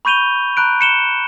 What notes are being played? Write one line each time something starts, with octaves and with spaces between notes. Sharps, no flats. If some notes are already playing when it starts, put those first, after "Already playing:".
B5 C#6 G6 D#7 F7 G7
A#5 B5 F#6 D7
C#7 E7 G7